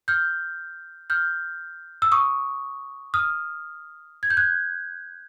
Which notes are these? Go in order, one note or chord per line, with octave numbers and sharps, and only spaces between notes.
F6 G6
F6 G6
E6
C#6 D#6
D#6 F6
G#6
G6
F#6 G#6